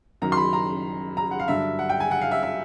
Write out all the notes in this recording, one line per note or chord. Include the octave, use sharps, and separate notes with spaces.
F#2 D#3 F#3 A#5
C6
B5
A#5
A#5
F#5
F5
G2 D3 F#3 E5
F#5
G5
G#5
F#5
F5
E5
E5